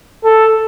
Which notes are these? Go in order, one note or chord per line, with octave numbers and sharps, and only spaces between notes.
A4